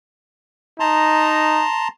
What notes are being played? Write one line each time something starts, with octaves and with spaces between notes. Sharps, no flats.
D#4 A5 A#5 C6